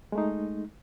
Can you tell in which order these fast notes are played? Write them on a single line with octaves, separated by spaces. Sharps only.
G#3 A3 D#4